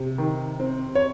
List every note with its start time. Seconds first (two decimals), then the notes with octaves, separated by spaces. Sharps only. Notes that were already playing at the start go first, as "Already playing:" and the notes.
Already playing: C3
0.18 D#3
0.60 C4
0.95 C#5